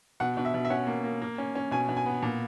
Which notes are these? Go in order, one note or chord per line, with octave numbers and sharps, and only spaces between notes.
B2 F#5
B2
E5
B2
E5
C#4 F#5
A#3
A#3
A#3
C#4
C#4
B2 G#5
B2
G#5
B3
A#2